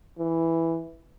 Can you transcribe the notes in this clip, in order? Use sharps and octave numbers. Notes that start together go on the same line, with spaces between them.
E3